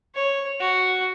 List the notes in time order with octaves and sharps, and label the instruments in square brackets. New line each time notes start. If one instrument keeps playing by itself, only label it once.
[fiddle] C#5
F#4